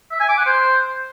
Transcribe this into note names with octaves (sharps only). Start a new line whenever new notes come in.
E5
G#5
D6
F#5
C5